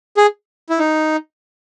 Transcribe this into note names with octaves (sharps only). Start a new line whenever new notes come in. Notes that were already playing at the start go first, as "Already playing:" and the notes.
G#4
E4
D#4